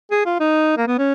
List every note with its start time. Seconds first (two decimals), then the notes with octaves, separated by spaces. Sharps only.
0.11 G#4
0.25 F4
0.40 D#4
0.77 A#3
0.87 B3
0.98 C#4